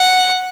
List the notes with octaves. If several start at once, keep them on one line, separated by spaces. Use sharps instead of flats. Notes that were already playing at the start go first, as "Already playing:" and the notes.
Already playing: F#5